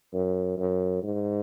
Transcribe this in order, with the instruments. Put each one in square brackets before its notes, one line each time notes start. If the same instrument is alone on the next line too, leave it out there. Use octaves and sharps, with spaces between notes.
[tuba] F#2
F#2
G#2